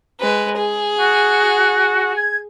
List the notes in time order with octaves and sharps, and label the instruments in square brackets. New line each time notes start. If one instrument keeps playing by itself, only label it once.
[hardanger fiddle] G#3 B4
G#4
[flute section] F#4
G#6